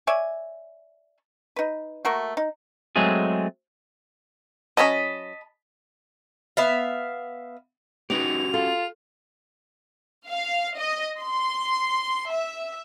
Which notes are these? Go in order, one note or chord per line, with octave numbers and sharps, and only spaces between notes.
C#5 D5 E5 G#5
D#4 B4
A3 A#3 F#4 A#4
D#4
F#3 G#3 A3 C4 G#4
F#3 C#4 D#5 A5 B5
B3 E5 F5
B3 C#4 D#4 F#4 G4 F7
F4 A4
F5
D#5
C6
E5